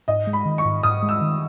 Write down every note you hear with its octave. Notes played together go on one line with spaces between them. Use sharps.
G#2 D#5
G#3
B5
D#3
C#6
G#2
G#2 D#6
G#3
E6
D#3